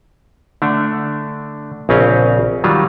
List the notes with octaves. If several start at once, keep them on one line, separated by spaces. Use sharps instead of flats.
D3 A3 D4
A#1 C#3 C4 C#4 D#5 F5
D#3 F#3 G3 F4